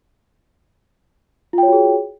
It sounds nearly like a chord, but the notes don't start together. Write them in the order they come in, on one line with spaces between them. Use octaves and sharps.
F4 G5 C#5 F#4 G#4